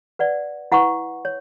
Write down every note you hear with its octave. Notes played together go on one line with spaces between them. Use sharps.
B4 D5 F#5
E4 B4 F#5 C#6
C#5